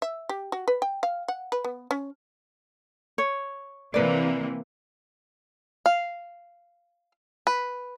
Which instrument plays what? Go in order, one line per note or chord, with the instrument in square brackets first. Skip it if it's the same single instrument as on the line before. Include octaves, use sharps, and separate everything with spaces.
[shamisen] E5
G4
F#4
B4
G5
F5
F#5
B4
B3
C#4
[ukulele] C#5
[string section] C3 E3 A#3 [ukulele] B4 D5
[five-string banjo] F5
B4